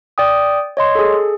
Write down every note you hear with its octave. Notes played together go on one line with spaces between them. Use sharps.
D5 G5 D#6
C#5 D#5 C6
G#4 A4